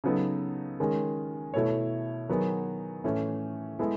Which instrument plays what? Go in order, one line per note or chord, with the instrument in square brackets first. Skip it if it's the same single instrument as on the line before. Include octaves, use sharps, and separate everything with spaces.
[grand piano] C#3 F#3 B3 D#4 A4
D#3 G#3 C#4 G#4
B2 A3 E4 A4 C#5
D#3 F#3 B3 D#4 G#4
A2 E3 A3 C#4
G#3 B3 E4 A4